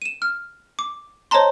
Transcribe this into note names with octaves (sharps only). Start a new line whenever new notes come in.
D#7 E7
F6
D6
C5 C#5 D#5 A5 A#5 C6